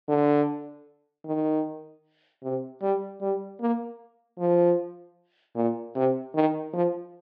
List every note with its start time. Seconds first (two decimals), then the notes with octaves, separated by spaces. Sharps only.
0.09 D3
1.25 D#3
2.43 C3
2.82 G3
3.21 G3
3.60 A#3
4.39 F3
5.56 A#2
5.96 C3
6.35 D#3
6.73 F3